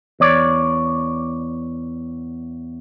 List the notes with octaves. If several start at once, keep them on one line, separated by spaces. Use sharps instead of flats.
E2 C#5 D5